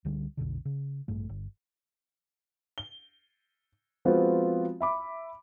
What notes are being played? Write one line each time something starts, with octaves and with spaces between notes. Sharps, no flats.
C#2 D3 G3
B1 F2 B2 D3
C#3
A1 G2 A3
G1
G7
F3 G#3 B3 C4 F4 F#4
E5 B5 D6